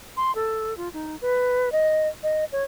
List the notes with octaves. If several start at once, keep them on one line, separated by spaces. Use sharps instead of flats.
C6
A4
F4
D#4
B4
D#5
D#5
C#5